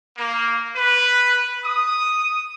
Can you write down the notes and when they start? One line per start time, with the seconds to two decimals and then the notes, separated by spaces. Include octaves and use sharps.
0.18 A#3
0.76 B4
1.65 D#6